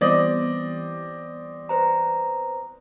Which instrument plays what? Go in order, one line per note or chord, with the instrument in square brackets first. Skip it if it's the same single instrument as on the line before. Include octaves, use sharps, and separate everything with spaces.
[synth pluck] E3 G3 B3 [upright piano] C4 D5 D#5
[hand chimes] B4 C5 A#5